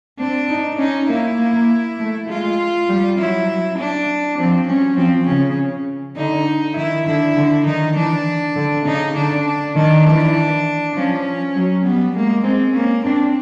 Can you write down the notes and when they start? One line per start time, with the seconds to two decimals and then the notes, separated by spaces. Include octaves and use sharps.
0.19 C4 D4
0.50 D#4
0.79 C#4 D#4
1.09 A#3 E4
1.38 A#3
1.99 A3
2.28 G#3 F4
2.89 G3
3.18 F#3 E4
3.78 D4
4.38 F3 C4
4.67 F#3 C#4
4.97 F3 C4
5.27 C#3 C#4
6.16 D3 D#4
6.76 D#3 E4
7.06 D3 E4
7.36 D3
7.66 D#3 D#4
7.96 E3 D4
8.56 D3
8.85 C#3 D#4
9.16 D3 D4
9.46 D4
9.75 D#3 D4
10.05 E3 D4
10.95 F3 C#4
11.55 F#3
11.84 G3 B3
12.15 G#3 A#3
12.44 G#3 C4
12.73 A#3 C#4
13.04 C4 D4